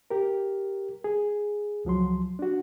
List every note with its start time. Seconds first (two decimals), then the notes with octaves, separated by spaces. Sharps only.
0.11 G4 A#4
1.04 G#4
1.85 C#2 F3 F#3 C6
2.39 D4 F#4